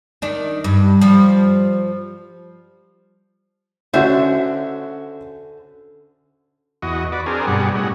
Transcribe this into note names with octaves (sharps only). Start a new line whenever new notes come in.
D#3 D4
G2
F3 G3
D3 C#4 F#4 C5 E5
E2 F#4 D#5
F#4 B4 D5
C4 D4 G#4 A#4
G2 B2 G3 G#4 F#5
A2 C#4 D#5 F#5